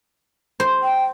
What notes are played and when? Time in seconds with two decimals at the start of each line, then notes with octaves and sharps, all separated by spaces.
0.60 C5
0.83 G5